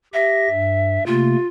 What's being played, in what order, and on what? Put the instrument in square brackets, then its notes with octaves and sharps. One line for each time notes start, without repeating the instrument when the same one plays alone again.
[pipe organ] G4 A#6 [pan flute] E5
[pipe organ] G2
[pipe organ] C3 A3 A#3 [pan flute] F4